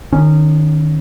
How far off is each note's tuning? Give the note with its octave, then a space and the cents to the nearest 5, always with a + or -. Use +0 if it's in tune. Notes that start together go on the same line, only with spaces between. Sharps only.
D#3 -25 C#4 +0